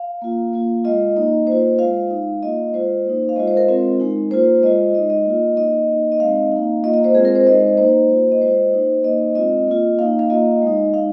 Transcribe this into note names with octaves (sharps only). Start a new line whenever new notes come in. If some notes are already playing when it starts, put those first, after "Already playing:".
Already playing: F5
A#3 F4
A#3 F4
G#3 F4 D#5
A#3 D#4
A#3 F4 C5
G#3 F4 F5
G#3 D#4
A#3 F4 D#5
G#3 F4 C5
A#3 D#4
F5
G#3 F4 D#5
C5
A#4
G#3 C4 F4 A#4
G#3 D#4
A#3 F4 C5
G#3 F4 D#5
G#3 D#4 D#5
D#5
A#3 F4
A#3 D#4 D#5
A#3 D#4
D#5
G#3 C4 D#4 F5
A#3 D#4
A#3 F4 D#5
D#5
C5
G#3 C4 F4 G#4
A#4
C5
G#3 D#4 D#5
A#3 D#4 C5
A#3 F4
D#5
G#3 F4 C5
A#3 D#4
A#3 D#4 D#5
G#3 C4 F4 D#5
A#3 F4
A#3 D#4 F5
F5
A#3 F4 D#5
G#3 D#4
G#3 D#4 F5